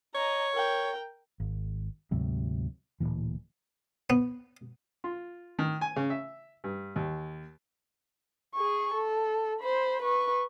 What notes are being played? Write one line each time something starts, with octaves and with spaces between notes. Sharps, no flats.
C#5 D#5 A#5
A#4 G5
G#1
D2 G#2 C3 F#3
D1 C#2 A#2 E3
B3
F4
D#3
G#5
C#3
E5
G2
D#2
G#4 C#6
A4
C5 B5
B4 C#6